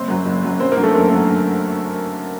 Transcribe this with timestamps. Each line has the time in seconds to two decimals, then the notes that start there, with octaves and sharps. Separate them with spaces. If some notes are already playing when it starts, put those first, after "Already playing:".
Already playing: F#1 C4 C5
0.08 F#2 F#3
0.25 F#1
0.43 F#2 F#3
0.60 F#2 C4 C5
0.72 A#3 A#4
0.77 D3 F#3
0.83 A3 A4
0.94 F#2 A#3
1.12 D3 F#3